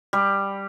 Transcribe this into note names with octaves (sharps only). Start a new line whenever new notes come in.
G3